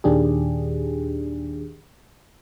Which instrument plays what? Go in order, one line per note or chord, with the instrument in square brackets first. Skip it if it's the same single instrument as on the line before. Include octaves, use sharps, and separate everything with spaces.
[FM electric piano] D#2 A#2 D#3 D4 G4 G#4